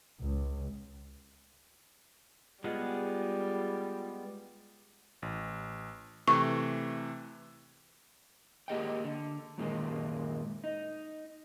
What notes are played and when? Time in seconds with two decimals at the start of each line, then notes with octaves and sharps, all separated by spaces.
0.20 C#2
2.64 G3 G#3 B3 F4 G#4 D#5 F#5
5.22 A1
6.28 C3 E3 A3 C#6
8.68 A#3 G4 G#4 D#5 F#5 G5
9.04 D3
9.58 F#2 A#2 D#3 G#3 A#3
10.64 D#4